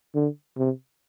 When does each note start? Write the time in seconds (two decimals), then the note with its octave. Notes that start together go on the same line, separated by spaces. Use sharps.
0.15 D3
0.57 C3